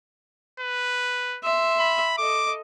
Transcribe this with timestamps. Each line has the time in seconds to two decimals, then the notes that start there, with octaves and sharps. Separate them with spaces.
0.60 B4
1.43 E5 C6
1.80 B5
2.18 A4 D#5 D6